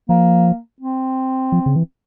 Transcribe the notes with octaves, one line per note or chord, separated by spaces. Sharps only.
F3 A#3
C4
F3
C#3
E3